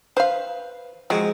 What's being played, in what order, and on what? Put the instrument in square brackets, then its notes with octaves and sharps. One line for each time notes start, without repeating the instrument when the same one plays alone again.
[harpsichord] B4 [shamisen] C5 F5
[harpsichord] F3 G#3 C4 [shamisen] F#3